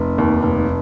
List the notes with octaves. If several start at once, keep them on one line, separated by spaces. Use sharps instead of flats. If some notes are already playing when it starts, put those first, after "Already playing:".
Already playing: F1
D#2
F1